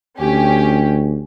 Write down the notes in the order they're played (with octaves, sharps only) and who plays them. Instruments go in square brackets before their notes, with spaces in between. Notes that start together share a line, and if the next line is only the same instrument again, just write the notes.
[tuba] D2 [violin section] C#4 G4